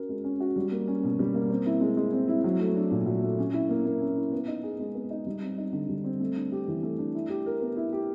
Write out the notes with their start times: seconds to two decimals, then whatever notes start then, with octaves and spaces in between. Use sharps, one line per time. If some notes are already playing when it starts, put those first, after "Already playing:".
Already playing: C#4 F#4 A#4
0.09 G#3
0.24 C#4
0.40 F#4
0.56 G3
0.72 A#3
0.88 C#4
1.04 B2
1.19 G3
1.34 A#3
1.50 C4
1.66 E4
1.81 G#3
1.97 G#3
2.13 C4
2.28 E4
2.44 F#3
2.60 A3
2.76 D4
2.91 A#2
3.06 F#3
3.23 A3
3.38 C#4
3.54 E4
3.69 A#3
3.85 A#3
4.01 C#4
4.17 E4
4.32 B3
4.48 D#4
4.63 G#4
4.80 G#3
4.95 B3
5.10 D#4
5.27 G3
5.42 C4
5.58 D#4
5.73 D3
5.89 G3
6.04 C4
6.20 A3
6.36 D4
6.52 G4
6.68 E3
6.83 A3
6.98 D4
7.15 E4
7.29 G4
7.46 A#4
7.61 B3
7.77 E4
7.93 G4